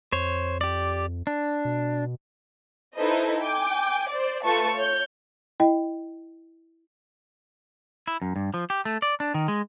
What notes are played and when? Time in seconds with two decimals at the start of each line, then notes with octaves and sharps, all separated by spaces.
0.12 F2 C5 C#5
0.61 G4 D5
1.27 D4
1.65 B2
2.95 D#4 E4 A4 B4 C5 D#5
3.41 G5 G#5 D6
4.09 C5 D5
4.44 A3 F4 B4 A5 C#6 A6
4.75 C#5 G6
5.60 E4 D#5 G5
8.08 E4
8.22 F#2
8.36 G2
8.54 F3
8.70 G4
8.85 A3
9.02 D5
9.20 D4
9.34 D#3
9.48 G#3